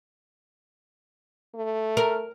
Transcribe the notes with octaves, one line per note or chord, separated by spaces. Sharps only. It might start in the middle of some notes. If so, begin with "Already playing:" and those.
A3
A#4